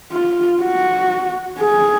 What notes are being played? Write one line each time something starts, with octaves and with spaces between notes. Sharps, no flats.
F4
F#4
G#4